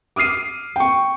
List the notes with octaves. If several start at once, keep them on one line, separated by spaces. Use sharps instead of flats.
D6 D#6 F6 C7 D#7
G5 C#6